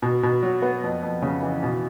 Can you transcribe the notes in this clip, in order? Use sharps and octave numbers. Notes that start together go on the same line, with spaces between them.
B2
B2
F#3
B3
F2
F2
C#3
E3
B2